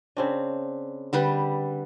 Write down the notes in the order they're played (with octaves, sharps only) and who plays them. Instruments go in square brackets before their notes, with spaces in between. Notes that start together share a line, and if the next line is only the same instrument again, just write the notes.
[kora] C#3 C4 D4
[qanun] D3 G3 B4